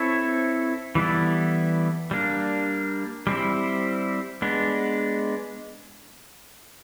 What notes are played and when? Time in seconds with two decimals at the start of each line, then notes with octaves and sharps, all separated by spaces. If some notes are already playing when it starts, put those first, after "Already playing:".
Already playing: C4 E4 A4 C#5
0.95 E3 G3 B3 E4 A4
2.11 G3 A#3 D4
3.27 G3 C4 E4
4.42 G#3 B3 D4